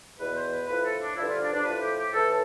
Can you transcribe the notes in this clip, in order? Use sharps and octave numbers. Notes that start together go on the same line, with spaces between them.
E2 B2 B4
C5
B4
A2 F3 B4
A4
D4
G2 D3 F3 E4
F4
D4
D4
A2 F3 B4
G4
G4
A2 E3 A4